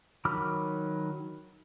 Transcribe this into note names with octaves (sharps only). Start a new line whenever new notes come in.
D#3 F#3 B5 D6 F6